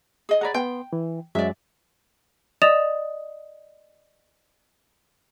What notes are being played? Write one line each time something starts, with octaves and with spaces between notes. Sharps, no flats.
G#4 D#5
G#4 D5 F#5 A#5 B5
B3 G5 C6
E3
F#2 F#3 G#3 D5 E5
D5 D#5 D#6 A6 E7 F7